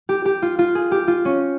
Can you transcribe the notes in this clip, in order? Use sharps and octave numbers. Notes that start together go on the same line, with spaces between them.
G4
G4
F4
F4
G#4
G4
F4
C#4